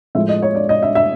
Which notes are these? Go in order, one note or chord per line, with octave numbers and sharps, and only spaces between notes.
A2 F3 G#3 E5
D#5
C#5
D5
D#5
E5
E5